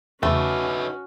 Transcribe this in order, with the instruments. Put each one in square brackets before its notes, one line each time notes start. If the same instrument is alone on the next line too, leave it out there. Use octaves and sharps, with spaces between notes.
[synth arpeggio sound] E2 C#3 [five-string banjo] A3 [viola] C#4 F#4 [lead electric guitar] D#4 B4